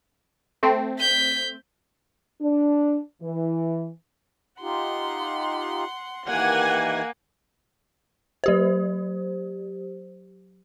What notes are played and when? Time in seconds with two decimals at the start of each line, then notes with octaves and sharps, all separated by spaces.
0.63 A3 C4
0.99 G6 B6
2.41 D4
3.22 E3
4.61 D#4 F4 G4 F#5 C6
6.26 D#3 E3 A#3 G4 F#5 G#5
8.44 F#3 G4 C5